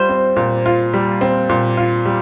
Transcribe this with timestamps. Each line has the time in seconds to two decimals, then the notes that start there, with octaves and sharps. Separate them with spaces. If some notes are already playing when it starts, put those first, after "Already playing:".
Already playing: G3 F4 C5
0.09 C4
0.36 A#2
0.66 F4
0.94 G3
1.21 C4
1.49 A#2
1.77 F4
2.05 G3